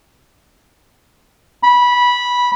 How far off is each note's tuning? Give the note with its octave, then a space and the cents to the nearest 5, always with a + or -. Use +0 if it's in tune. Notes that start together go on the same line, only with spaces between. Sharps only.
B5 -15